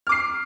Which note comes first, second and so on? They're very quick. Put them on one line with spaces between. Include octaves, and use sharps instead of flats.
F6 D6 C7